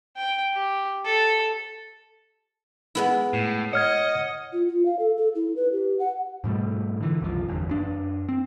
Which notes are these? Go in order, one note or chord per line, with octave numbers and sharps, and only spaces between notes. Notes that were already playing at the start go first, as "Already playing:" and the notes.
G5
G4
A4
G#3 B3 E4
A2
C#5 D#5 F#5 F6 G#6
F4
F4
F5
A4
A4
E4
B4
G4
F#5
G#2 B2 G3 A3
D3 E3
F#1 C2 B2 F3
G1 E2 G2
F#2 D4
C4